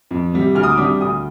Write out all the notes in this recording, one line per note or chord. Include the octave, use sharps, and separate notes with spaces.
F2
C3 G3
D2 F6
D#6
D6
C3 G3 D4 D#6
D2 D#6